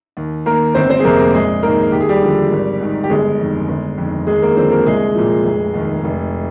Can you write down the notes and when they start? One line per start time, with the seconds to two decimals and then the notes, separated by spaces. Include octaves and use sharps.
0.17 D#2
0.46 D#3 A#3 A#4
0.75 G1 C4 C5
0.90 C4 C5
1.00 G#4
1.04 F2 C3 A#3 A#4
1.19 A#3 A#4
1.34 A#1 G#3 G#4
1.63 G#2 D#3 A#3 A#4
1.92 D#2 G4
2.00 G#4
2.09 G3 G4
2.22 D3 F3
2.51 G#1
2.80 G#2 D#3
3.04 G4
3.10 G1 G#3 G#4
3.40 F2 D#3
3.69 G1
3.98 F2 D#3
4.27 D#2 G#3 G#4
4.42 A#3 A#4
4.57 D3 F3 C4 C5
4.71 A#3 A#4
4.86 C2 G#3 G#4
5.15 A#2 F3
5.45 F1
5.74 D#2 D#3
6.04 F1